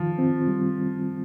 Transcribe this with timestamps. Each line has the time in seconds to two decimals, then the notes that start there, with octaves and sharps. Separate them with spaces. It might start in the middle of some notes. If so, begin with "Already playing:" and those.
Already playing: D#3 F3 F4
0.18 C4
0.48 G3